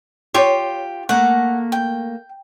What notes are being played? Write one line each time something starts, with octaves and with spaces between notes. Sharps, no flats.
F4 G4 C#5
A3 A#3 F#5
G5